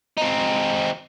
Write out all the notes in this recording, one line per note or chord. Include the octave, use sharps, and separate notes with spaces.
C4 D#4